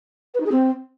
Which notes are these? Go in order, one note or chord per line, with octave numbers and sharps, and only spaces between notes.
B4
D#4
G#4
C4